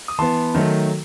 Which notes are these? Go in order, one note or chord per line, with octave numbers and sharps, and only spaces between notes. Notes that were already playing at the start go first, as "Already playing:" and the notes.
D#6
E3 B3 A5 C6
D#3 F#3 A3